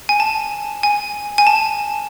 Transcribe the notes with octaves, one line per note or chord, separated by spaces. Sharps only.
G#5
A5
G#5
G#5
A5